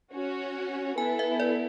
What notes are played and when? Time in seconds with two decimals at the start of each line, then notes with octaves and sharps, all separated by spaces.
0.13 C#4 F#4 C#5
0.97 B3 E4 A4 G#5
1.19 E5
1.40 D5